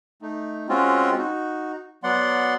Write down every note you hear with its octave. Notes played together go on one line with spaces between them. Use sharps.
A3 D#4
G#3 C4 C#4 F4 F#4
D#4 F#4
F#3 B3 D5 F#5 C6